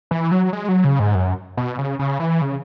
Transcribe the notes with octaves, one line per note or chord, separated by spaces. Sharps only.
E3
F#3
G#3
F#3
C#3
G#2
F#2
B2
C#3
C#3
E3
C#3